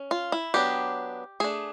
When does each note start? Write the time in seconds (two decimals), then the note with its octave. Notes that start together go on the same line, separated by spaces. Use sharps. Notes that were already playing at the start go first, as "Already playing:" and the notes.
Already playing: C#4
0.11 F4
0.32 E4
0.54 F#3 B3 D4 G4
1.40 A3 D4 G#4